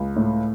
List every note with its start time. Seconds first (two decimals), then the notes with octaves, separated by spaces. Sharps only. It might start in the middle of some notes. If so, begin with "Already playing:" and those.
Already playing: C#2
0.16 A2